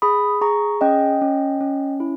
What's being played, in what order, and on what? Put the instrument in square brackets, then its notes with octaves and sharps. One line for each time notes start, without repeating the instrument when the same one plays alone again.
[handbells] G#4 B5 D#6
G#4 A#5 C#6
C#4 D#5 G5
C#4
C#4
E4